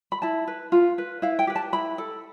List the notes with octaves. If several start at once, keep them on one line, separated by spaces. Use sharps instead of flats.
B5
E4 A5
B4
F4
B4
E4 F5
G5
G4 B4
A5
E4 B5
A4